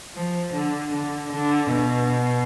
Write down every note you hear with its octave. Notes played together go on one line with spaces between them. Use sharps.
F3
D3
D3
D3
B2